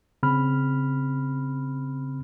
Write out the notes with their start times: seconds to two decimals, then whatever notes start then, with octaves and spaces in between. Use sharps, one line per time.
0.23 C#3 C4 B5 F6